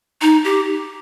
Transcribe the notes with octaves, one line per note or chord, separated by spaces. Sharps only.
D#4
G4